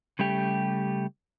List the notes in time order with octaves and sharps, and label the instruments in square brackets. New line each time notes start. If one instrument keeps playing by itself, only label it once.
[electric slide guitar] C#3 G3 A3 G4